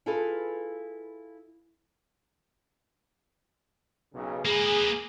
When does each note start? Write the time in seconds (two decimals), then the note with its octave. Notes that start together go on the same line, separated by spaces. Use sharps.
0.06 E4 F4 G#4 A4 B4 F5
4.13 B1 C#3
4.45 A#3 G#4 B4